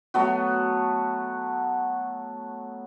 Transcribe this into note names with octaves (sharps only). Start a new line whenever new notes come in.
F#3 A3 B3 F#4